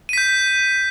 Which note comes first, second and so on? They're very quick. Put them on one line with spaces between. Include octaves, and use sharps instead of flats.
D#7 B6 G6